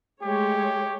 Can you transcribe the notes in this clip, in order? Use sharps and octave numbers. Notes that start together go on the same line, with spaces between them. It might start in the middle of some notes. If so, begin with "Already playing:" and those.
G#3 A3 G4 C#5